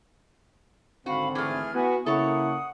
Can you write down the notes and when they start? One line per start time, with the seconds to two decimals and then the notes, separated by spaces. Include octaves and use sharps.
1.06 G#1 D3 C4 F#4 F5 B5
1.35 E3 A3 G#4 F6 G#6
1.74 B3 E4 F#4 B4 G#5
2.06 C#3 A#3 E4 A4 C#5 F#5 D#6